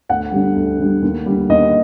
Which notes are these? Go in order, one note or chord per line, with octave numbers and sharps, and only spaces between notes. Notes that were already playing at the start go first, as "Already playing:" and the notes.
D2 F#5
D3 G3
D2
D3 G3
D#2
D3 G3
D#2 D#5